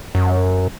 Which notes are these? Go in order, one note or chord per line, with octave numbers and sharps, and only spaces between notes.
F#2